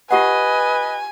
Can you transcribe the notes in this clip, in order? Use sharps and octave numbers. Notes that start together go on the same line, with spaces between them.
F4 G4 B4 D#5 F#5 G#5